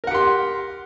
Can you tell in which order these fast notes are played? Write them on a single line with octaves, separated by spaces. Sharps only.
A#4 F#5 G4 C6